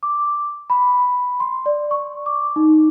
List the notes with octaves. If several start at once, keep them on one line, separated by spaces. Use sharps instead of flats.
D6
B5
C6
D5
C#6
D6
D#4